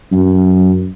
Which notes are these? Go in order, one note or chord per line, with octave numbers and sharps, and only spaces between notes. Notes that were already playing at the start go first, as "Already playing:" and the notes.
F#2